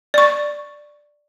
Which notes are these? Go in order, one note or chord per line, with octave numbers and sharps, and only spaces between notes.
D5 C#6